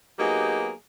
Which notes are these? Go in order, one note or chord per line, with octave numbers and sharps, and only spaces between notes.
F#3 A#3 B3 D#4 G4 G#4